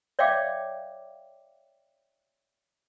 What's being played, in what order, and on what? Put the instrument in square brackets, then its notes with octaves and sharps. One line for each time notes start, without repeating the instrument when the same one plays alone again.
[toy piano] C#5 D5 E5 F5 G5 D6